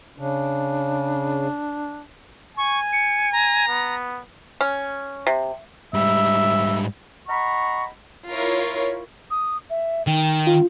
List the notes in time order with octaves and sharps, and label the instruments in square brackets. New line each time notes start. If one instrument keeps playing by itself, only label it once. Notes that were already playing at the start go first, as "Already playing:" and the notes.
[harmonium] C#3 [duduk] D4
[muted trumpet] G#5 [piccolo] C#6
[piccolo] C#7
A#5
[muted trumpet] B3
[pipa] C#4
C3
[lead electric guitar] G#2 G3 [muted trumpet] E5
[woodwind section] D#5 F#5 A#5 B5 C#6
[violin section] E4 F4 A#4 C#5
[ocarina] D#6
E5
[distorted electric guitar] D#3 [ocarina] G5
[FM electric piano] F4